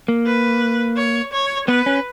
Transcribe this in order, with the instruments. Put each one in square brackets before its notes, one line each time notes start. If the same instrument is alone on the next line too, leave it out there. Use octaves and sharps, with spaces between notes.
[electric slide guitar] A#3
[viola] B4
C#5
C#5
[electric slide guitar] B3 [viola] B4
[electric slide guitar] C#4